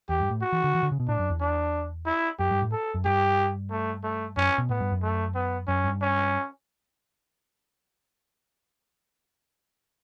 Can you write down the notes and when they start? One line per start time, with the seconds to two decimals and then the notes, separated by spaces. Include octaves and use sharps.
0.09 E2 G4
0.20 G2
0.31 A2
0.42 F#4
0.52 E3
0.64 D3
0.75 E3
0.83 D3
0.92 C#3
1.00 B2
1.08 A2 D4
1.19 F#2
1.30 E2
1.41 D4
2.06 E4
2.39 F#2 G4
2.51 G2
2.62 A2
2.72 A4
2.94 F#2
3.05 G2 G4
3.70 A3
4.04 A3
4.37 F#2 C#4
4.58 B2
4.69 A2 B3
4.80 G2
4.92 F#2
5.03 A3
5.35 B3
5.68 F#2 C#4
5.84 G2
6.02 C#4